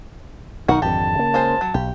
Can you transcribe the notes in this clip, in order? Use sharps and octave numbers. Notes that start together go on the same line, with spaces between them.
B1 D#3 D#4 F#4 A#4 F#5
G#1 F2 D3 G4 A5
C#3 A#3
G#3 F4 C5
F#3
B1 G4